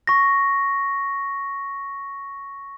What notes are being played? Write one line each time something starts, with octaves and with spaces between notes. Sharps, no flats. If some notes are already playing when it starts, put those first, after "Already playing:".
C#6 A#6